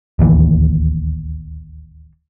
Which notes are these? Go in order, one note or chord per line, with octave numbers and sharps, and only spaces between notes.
D1 A1 D#2 E3